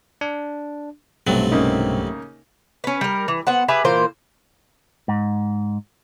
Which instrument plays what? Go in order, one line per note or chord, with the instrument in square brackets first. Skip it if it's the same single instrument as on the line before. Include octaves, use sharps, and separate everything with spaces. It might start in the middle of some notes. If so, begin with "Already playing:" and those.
[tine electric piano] D4
[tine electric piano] B1 G2 C4 [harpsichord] C3 F#3 A3
[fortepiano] C#3 A#3 D#4
[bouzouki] C#4 B4
G3 A#4
E3
B3 C5 F#5
G4 G#4 B4 E5
A#2 E3 A#3 C5
[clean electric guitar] G#2